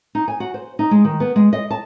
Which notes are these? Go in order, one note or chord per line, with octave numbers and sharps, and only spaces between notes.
D#4
G#5
F#4
C5
D#4
G#3
D#3
B3
G#3
D#5
A5